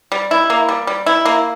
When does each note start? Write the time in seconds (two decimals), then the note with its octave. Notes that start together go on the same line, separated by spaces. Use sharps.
0.12 G3
0.31 E4
0.50 A#3
0.69 G3
0.87 G3
1.06 E4
1.25 A#3